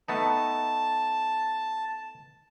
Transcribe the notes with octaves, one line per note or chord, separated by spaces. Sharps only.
A3 B3 D#4 A5